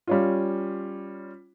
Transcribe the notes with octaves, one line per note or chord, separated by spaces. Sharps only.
G3 C#4 F4